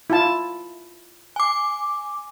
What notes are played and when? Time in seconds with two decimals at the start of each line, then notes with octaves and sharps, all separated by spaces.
0.10 E4 F4 A5
1.36 G#5 D6